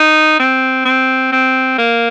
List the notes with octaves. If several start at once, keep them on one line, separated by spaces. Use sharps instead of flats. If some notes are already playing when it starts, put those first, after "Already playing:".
Already playing: D#4
C4
C4
C4
A#3